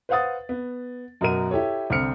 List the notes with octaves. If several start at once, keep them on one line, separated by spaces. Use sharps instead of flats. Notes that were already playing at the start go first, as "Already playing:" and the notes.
B4 C5 F5 F#5 D#6 A6
B3
F#2 B2 F#4 A#4 D#7
E4 G4 A4 C#5
C2 D3 C4 F6 C#7